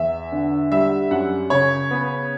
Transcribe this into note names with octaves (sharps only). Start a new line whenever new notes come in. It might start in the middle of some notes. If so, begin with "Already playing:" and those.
Already playing: E2 E5
D3
G3 E5
F#2 F#5
C#3 C#5
B3